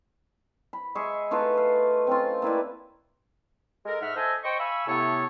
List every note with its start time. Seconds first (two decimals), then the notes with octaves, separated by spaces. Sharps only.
0.73 B5
0.95 G#3 G#4 E5 C#6
1.31 A3 D#4 F4 B4
1.57 F5
2.07 C4 C#4 F4
2.42 A#3 E4 B4 D5
3.86 G#3 A4 A#4
4.01 G#2 E5 F#5 F6
4.16 A4 C5 D#5 E5 G#5
4.43 C5 D#5 G5 C#6
4.59 F5 G#5 B5 C#6 E6
4.87 A2 C3 B3 A4 C#5